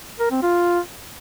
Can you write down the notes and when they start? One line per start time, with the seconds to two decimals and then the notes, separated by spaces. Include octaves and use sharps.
0.19 A#4
0.31 C4
0.43 F4